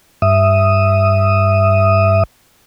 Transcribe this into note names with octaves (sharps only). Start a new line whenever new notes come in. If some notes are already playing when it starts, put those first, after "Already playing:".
G2 E5 D#6